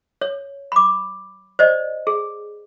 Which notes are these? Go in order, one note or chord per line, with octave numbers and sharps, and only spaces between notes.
C#5
B5 D6
C5 D5 D#5
G#4